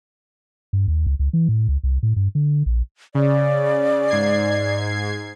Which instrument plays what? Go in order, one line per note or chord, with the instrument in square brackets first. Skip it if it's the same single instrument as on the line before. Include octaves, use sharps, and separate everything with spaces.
[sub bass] G2
D#2
C#2
C#2
E3
A2
C#2
C2
A2
G2
D3
A#1
[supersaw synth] C#3 [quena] D5
[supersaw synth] G#2 G#6 C7